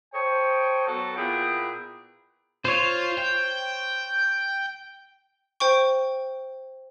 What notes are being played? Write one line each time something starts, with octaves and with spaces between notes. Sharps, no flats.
A4 C5 C#5 D#5 G5
F#3 B3 F#4 A4
A#2 B3 E4 G#4 B4 G5
F4 C5 C#5
G5
C5 G5 C#6